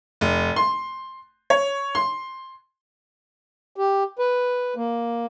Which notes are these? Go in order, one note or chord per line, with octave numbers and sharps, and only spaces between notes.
F1
C6
C#5
C6
G4
B4
A#3